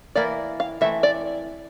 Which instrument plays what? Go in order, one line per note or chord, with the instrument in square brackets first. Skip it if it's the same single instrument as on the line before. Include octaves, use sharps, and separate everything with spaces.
[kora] E3 A#3 E4 A#4 [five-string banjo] D5
[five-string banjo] F5
[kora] E3 A3 C4 [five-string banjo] E5
[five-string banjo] D5